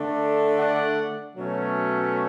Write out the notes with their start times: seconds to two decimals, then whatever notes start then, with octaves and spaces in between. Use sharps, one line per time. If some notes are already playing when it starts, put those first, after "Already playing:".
Already playing: D3 A3 D4
0.59 D5 F#5
1.35 B2 F#3 A3 C#4